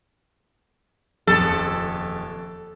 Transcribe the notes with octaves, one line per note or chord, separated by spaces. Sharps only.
D#1 F2 C#3 A4